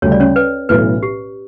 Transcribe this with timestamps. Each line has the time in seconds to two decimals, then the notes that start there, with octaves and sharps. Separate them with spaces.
0.02 D2 C#3 G3 C#5
0.12 D5
0.20 C#4 C#5
0.36 B4
0.69 B1 A2 E3 B3 B4
1.03 G4